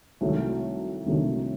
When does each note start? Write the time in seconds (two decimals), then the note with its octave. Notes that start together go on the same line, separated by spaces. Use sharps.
0.21 C2 C3 D#3 F#3 A3
1.06 C2 C3 D#3 F#3 A3